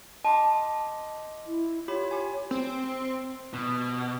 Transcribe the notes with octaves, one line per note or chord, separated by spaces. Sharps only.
D#5 A5 C6 D6
E4
F4 G4 C#5 B5
G4 G#5
C4
B2